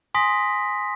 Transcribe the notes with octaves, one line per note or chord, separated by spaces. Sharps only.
G#5 C6 D#6 A#6 B6